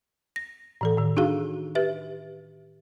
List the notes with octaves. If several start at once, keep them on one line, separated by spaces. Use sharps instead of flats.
A#6
A2 E3 A4
A2 D#3
D4 D#4 F#4 G#4 F5
G4 B4 E5